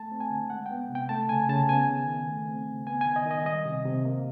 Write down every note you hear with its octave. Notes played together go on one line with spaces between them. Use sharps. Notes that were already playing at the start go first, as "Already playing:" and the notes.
Already playing: A3 A5
C4
G#5
D3
G#3 F#5
B3 G5
C3
G5
A3 A5
C#3 G#5
C#3 A5
B3 G#5
D#3
D#3
A3
C4
C#3
B3 G#5
D#3 G#5
D#5
D#3
D#5
G3 D#5
C3
C3
A#3